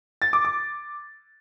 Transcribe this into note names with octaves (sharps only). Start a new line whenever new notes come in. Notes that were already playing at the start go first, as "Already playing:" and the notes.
A6
D6
D6